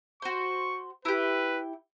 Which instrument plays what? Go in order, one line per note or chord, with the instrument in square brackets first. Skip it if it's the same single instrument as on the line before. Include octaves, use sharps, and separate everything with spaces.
[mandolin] F#4 C5 [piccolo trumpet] C#6
[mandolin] E4 G4 [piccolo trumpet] B4